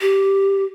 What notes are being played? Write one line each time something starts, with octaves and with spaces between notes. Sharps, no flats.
G4